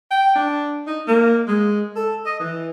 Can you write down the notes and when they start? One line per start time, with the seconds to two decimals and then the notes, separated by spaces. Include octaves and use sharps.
0.11 G5
0.36 D4
0.87 D#4
1.08 A#3
1.47 G#3
1.96 A4
2.26 D#5
2.40 E3